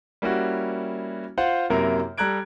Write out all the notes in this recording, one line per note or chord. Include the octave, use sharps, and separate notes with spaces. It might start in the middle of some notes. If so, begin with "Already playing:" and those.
G3 A#3 C#4 E4 F#4
F4 C5 F5 F#5
F#2 C3 A#3 E4 A#4
G3 A4 A#5 F#6 G#6 D7